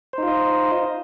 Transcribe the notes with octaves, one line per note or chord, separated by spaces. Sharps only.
D#4 F4 C5 D#5